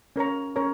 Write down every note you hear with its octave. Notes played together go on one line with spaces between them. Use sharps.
C#4 A#4 C#5 A#5
C#4 A#4 C#5 A#5